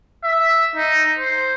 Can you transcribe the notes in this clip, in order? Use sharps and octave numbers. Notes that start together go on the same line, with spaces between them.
E5
D#4
C5